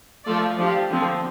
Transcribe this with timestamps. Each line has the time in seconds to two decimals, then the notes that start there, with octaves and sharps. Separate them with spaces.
0.25 F3 A3 F4 A4 D5
0.57 F3 D4 G4
0.90 D3 F3 C4